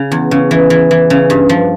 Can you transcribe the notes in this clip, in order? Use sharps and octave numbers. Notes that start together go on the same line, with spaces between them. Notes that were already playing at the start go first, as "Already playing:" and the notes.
Already playing: C#3
E2
C#3
E3
E3
E3
C#3
G2
F3